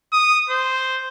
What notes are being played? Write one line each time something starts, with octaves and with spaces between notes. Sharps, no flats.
D#6
C5